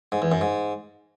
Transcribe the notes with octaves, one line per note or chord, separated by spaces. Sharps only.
G#2
E2
F#2
G#2